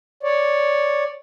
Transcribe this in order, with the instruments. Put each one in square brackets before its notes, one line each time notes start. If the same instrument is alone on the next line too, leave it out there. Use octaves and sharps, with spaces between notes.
[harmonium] C#5 D5